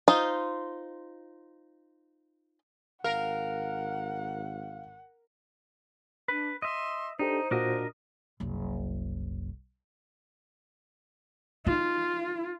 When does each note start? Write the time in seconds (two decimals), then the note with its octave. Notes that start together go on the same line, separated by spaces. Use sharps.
0.08 D#4 F4 C5
3.04 G#1 A#4 F5 F#5
6.28 D4 B4
6.62 D#5 E5 C6
7.19 D4 D#4 G4 A4 C5
7.51 A#2 D4 F4 F#4 A#4 D#5
8.40 F#1 C2
11.67 D#4 F4